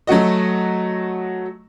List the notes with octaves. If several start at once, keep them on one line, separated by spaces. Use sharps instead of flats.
F#3 A3 F#4 D#5